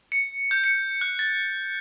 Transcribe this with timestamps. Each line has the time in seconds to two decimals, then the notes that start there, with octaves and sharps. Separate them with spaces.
0.12 C#7
0.51 G6
0.64 C#7
1.01 F#6
1.19 A6